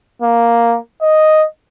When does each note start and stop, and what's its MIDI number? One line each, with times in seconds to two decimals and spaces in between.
0.22 0.77 58
1.02 1.44 75